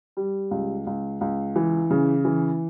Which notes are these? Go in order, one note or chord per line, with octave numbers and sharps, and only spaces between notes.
G3
C#2
C#2
C#2
E3
C#3
E3